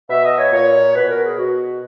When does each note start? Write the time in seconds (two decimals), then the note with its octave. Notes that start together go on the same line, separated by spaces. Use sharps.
0.09 B2 E5
0.24 D#5
0.38 C#5
0.52 A#2 C#5
0.95 B2 B4
1.08 A#4
1.23 G#4
1.37 B2 F#4